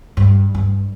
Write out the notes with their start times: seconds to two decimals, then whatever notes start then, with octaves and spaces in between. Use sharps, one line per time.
0.17 G2
0.55 G2